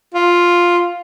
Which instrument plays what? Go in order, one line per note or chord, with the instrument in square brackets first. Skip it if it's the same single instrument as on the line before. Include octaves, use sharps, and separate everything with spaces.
[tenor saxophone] F4